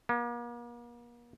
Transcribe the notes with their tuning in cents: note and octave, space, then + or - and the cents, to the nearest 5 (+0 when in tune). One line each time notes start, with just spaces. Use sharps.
A#3 +40